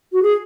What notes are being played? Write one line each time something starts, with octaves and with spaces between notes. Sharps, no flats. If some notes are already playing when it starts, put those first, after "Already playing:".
F#4
G#4